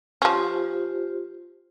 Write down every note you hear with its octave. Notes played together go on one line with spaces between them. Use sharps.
F3 C#4 F4 G4 C5